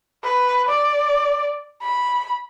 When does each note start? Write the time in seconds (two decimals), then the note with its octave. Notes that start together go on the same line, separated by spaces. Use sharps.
0.23 B4
0.68 D5
1.82 B5